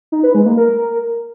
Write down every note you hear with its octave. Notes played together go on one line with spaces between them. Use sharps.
D#4
B4
G#3
A#3
A#4